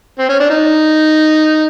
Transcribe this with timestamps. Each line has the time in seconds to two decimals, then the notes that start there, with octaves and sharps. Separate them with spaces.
0.19 C4
0.29 C#4
0.40 D4
0.50 D#4